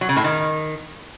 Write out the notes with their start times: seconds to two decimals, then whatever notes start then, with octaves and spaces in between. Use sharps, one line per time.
0.01 F#3
0.09 C#3
0.17 A2
0.24 D#3